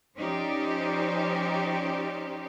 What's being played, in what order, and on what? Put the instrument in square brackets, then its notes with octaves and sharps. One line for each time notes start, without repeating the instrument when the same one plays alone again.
[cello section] F3 C#4 D#4 G4 C5 D5